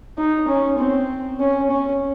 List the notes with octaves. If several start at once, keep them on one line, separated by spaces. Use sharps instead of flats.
D#4
C#4
C4
C#4
C#4